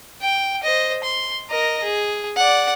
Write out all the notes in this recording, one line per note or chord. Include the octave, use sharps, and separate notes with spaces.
G5
C5 D#5
C6
A#4 D#5
G#4
D5 F#5